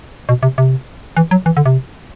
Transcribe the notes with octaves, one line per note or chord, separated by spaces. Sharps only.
B2
C3
C3
E3
F#3
E3
D3
C3